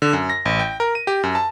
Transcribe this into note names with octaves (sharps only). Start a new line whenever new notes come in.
D3
F#2
A#6
A1
G5
A#4
D#7
G4
F#2
A5